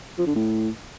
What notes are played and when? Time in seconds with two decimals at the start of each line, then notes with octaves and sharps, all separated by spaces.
0.18 F3
0.27 D3
0.35 A2